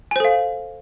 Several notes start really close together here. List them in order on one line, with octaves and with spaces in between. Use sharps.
G#5 C5 A4 F5